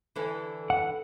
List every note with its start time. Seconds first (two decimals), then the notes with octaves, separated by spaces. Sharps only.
0.16 D3 E3 A4
0.70 F#5